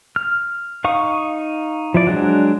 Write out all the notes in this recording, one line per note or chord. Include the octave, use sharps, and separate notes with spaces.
F6
D#4 F5 C#6 D#6
F3 E4 D5
F#3 G#3 D4